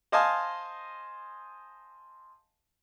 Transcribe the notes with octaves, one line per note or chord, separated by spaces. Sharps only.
C5 D#5 F5 G#5 A5